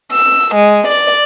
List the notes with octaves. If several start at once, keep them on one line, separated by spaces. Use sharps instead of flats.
E6
G#3
D5